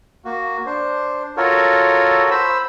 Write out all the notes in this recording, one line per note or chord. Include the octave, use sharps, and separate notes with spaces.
A#3 F#4
D4 C5
F4 F#4 A4 A#4 C#5
C5 B5 E6